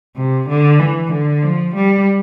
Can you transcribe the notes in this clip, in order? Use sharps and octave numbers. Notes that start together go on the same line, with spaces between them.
C3
D3
E3
D3
F3
G3